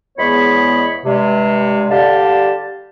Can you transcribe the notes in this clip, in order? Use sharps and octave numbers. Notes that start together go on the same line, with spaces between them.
E2 G#3 B3 C#5 B5
G2 C3 G#3
D3 G3 G4 F5 A5